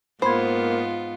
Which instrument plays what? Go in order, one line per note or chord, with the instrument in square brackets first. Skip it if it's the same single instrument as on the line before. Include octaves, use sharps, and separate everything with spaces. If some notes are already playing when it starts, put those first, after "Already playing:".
[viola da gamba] G#2 B3 F4 [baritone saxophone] A#3 [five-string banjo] C5 [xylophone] B5 C6 G#6